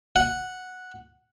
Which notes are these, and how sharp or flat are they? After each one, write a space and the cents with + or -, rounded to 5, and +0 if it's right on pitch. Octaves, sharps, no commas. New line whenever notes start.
F#5 -5